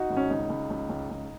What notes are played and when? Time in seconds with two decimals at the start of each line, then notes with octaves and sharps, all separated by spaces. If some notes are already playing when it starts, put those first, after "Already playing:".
Already playing: D#4 F#4
0.10 G#1
0.17 C#4
0.30 C#2 D#4
0.50 C#2
0.70 C#2
0.89 C#2
1.11 C#2